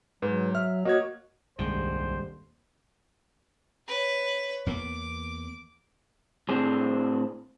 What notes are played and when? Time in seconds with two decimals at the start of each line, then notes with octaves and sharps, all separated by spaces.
0.22 G#2 F#3 B4
0.55 E5 F6
0.85 A#3 F#4 C#5 D#5 G#6
1.59 D#1 C2 G2 D#3 G#3 C5
3.88 B4 C#5
4.66 E2 A#3 B3 D6
6.49 A2 C4 D4 G#4 C5